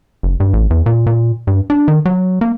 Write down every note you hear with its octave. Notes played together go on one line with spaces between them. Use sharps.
F#1
G2
A1
E2
A#2
A#2
G2
D4
D#3
F#3
A#3